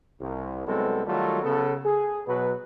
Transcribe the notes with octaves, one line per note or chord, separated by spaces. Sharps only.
C2
C2 F#3 G#3 B3 C4 A4
D#3 F#3 G3 A3 F4 A4
C#3 B3 A4
G#4
B2 F#3 B4